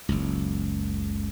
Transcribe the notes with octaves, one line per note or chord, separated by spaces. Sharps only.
F#1 C#2